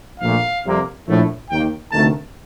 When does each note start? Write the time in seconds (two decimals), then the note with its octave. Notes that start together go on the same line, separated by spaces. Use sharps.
0.20 A#1 A#2 A3 F5
0.64 F2 C3 G3 A#3
1.07 A#1 A2 A3
1.49 D#2 D#3 A#3 G5
1.92 D2 C3 D#3 A3 A5